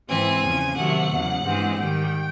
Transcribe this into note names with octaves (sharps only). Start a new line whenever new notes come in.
G#2 E3 G#3 C4 G#5
E2 C#3 F3
C3 D#3 F#3 A3 F#5
E2 C#3 F#3
G2 E3 G#3 C4
G#2 D#3 G3 G5